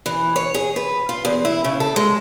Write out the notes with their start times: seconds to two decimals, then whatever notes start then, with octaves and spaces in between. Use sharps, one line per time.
0.06 E3
0.36 C#5
0.54 G#4
0.76 B4
1.09 F4
1.25 E2
1.45 E4
1.64 C#3
1.80 A4
1.96 G#3